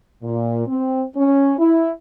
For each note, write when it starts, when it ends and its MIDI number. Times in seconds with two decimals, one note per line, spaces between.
0.23 0.67 46
0.67 1.03 60
1.16 1.54 61
1.59 1.90 64